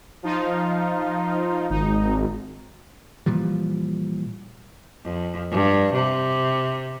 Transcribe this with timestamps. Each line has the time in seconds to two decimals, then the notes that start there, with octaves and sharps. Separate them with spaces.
0.23 F3 D#4 F4
1.70 G#1 D#4
3.26 A#2 E3 F3 G3
5.04 F2
5.52 G2
5.93 C3